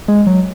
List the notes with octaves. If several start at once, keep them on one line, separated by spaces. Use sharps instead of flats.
G#3
F#3